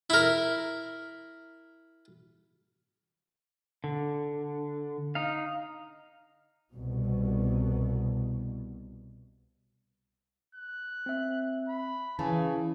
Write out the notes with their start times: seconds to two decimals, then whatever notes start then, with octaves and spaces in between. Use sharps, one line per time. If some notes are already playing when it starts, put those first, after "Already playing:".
0.10 E4 A#4
3.84 D3
5.15 D#4 F5
6.75 C2 B2
10.55 F#6
11.06 C4 E5
11.69 B5
12.19 C#3 E3 G#5 A5